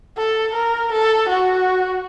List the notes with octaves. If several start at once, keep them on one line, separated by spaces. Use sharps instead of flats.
A4
A#4
A4
F#4